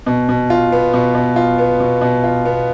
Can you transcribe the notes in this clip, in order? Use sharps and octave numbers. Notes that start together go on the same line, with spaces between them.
B2
B2
F4
B3
B2
B2
F4
B3
B2
B2
F4
B3